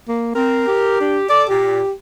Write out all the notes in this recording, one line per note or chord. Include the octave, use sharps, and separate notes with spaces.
A#3
C4 A#4
G4
D4
A4 D5 D6
A#2 G4